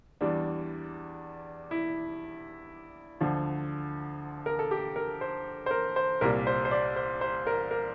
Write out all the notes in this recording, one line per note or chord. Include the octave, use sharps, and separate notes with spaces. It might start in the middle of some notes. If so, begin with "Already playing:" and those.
E2 E3 G3 D4
E4
D2 D3 F3
A#4
A4
G4
A#4
C5
C5
A#4
C5
C2 A#2 G3 A#4
C5
C5
D5
C5
C5
A#4
A#4